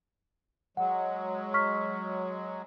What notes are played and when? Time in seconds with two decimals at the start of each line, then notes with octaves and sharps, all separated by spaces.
0.77 F#3 G#3 F#5
1.54 C#6 F6 B6